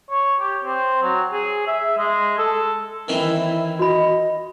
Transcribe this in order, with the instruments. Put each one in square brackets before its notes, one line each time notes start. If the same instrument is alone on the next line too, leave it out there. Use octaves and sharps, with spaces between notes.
[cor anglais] C#5
G4
C4
F#3
G#4
E5
G#3
A4
[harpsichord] D#3 E3 C4 [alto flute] E4
[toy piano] F#4 B5 [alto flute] D#5